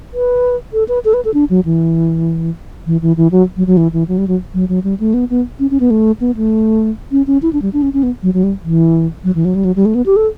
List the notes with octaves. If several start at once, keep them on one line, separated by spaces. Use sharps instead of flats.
B4
A4
B4
A4
B4
A4
D4
F#3
E3
E3
E3
E3
F#3
F#3
F#3
E3
E3
F#3
G3
F#3
F#3
F#3
G3
A3
B3
B3
C#4
C#4
B3
A3
B3
A3
C#4
C#4
E4
D4
G3
D4
C#4
C#4
B3
F#3
F#3
G3
E3
F#3
E3
F#3
G3
F#3
G3
A3
B3
G4
A4